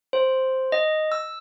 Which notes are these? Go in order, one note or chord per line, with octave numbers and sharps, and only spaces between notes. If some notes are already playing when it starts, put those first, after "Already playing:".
C5
D#5
E6